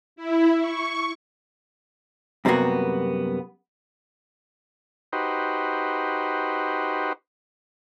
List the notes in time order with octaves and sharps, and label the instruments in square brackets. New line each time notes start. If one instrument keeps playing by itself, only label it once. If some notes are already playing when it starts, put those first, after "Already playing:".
[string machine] E4
C#6
[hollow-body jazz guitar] F#2 C3 G3 A#3 B3 F#4
[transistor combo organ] D#4 F#4 G4 B4 C5